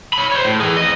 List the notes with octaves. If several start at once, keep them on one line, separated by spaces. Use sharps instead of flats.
C#5 B5
C5 C#5
A2
E3 G#4
F2 D#5